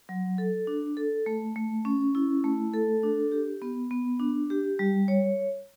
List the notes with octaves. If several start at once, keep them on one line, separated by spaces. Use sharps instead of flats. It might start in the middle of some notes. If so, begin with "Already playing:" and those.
F#3
A4
D4
A4
A3
A3
C#4
E4
A3
A4
D4
G4
B3
B3
D4
G4
G3
C#5